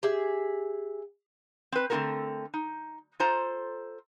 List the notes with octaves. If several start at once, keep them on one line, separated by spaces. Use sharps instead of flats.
G4 G#4 E5
C4 B4
D3 A3 C4 F#4 A4 A#4
D#4
F4 A4 C5 A#5